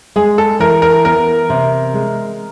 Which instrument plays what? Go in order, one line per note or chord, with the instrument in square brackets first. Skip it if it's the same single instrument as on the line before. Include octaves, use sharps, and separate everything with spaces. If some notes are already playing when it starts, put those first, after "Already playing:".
[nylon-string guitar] G#3 [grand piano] G#4
[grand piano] A4
[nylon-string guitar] E3 [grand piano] A#4
[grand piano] A#4
[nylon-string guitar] B3 [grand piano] A#4
[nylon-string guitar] C3
G#3